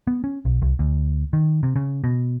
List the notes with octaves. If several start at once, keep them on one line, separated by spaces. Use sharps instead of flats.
B3
C#4
B1
C2
D2
D#3
C3
C#3
B2